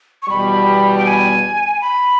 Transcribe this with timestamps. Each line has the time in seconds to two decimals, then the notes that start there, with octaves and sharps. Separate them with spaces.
0.22 C#6
0.29 E2 B2 G3 B5
0.98 G5
1.06 G#5
1.81 B5